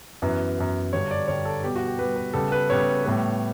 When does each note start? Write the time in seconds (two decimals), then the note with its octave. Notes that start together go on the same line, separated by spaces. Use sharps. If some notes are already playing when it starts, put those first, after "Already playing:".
0.22 F#2 E3 B3
0.58 F#2 E3 B3
0.93 G2 D3 G3 C#5
1.11 D5
1.28 G2 D3 G3 C#5
1.45 A4
1.63 B2 G3 B3 G4
1.76 F#4
1.87 G4
1.99 B2 G3 B3 B4
2.16 B4
2.33 C#3 G3 B3 A4
2.52 B4
2.69 C#3 G3 B3 C#5
3.04 A2 G3 B3